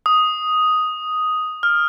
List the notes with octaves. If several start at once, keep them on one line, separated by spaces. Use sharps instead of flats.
D#6
F6